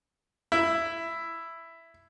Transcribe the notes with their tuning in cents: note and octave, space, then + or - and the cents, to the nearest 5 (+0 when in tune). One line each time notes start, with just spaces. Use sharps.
E4 +5